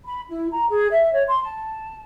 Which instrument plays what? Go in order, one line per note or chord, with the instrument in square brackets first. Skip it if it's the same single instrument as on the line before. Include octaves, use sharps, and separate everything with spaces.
[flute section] B5
E4
A#5
G#4
E5
C#5
C6
A5